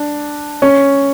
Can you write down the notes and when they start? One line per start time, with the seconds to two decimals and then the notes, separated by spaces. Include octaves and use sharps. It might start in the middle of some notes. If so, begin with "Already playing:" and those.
Already playing: D4
0.62 C#4